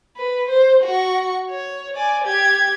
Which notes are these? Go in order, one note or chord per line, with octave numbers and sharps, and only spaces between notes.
B4
C5
F#4 C#6
C#5
D5 G#5
G4 G#6